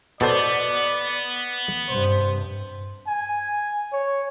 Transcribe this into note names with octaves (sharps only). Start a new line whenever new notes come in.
B2 B3 A4 C5 D5
G2 C3 C5
G#5
C#5